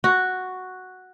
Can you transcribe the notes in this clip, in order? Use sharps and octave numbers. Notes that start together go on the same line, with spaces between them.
F#4